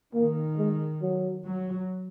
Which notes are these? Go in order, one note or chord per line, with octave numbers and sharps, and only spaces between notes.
D#3 A#3
G#3
F#3
F#3